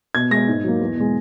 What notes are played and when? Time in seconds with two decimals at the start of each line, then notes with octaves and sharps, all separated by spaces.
0.15 B2 G#6
0.31 G#3 A#6
0.48 G#2
0.64 F#3 A#3
0.81 E2
0.97 B2 G#3